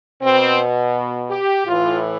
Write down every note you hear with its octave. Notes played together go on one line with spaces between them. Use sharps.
B2 C4
G4
A2 E3 F4